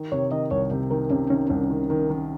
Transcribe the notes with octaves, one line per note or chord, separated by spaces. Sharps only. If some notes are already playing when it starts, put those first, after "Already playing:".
Already playing: D#3
C3 C#5
D#3 D#5
C2 C#5
C3
D#3 A#4
C3 C#4
D#3 C#4
C2 C#4
D#3
D#3
D#3